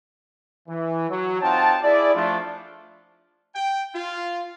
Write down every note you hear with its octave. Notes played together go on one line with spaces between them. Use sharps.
E3
F#3
C4 D#4 F4 F#5 G5 A5
E4 G#4 D5
F3 A3 D4 F4
G5
F4